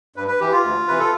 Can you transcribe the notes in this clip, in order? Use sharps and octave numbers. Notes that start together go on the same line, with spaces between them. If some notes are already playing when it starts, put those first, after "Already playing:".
G2 B4
B4
E3 G4
F4
D2
C3 E3 B4
A4